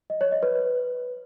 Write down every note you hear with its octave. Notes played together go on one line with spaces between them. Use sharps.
D#5
C#5
D#5
B4